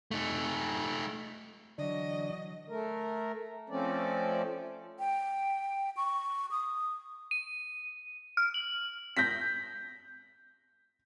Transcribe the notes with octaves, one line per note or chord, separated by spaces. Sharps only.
A3 D#4
D3 E3 F#3 D4 D#5
A3 A#4
F3 A3 C4 C#4 D5
G5
C#6
D#6
D#7
F6
F#7
G6 A#6 B6